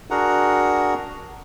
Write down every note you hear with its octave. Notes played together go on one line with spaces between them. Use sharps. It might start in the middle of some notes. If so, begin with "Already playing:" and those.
D4 F#4 G#4 A#4 F#5 A#5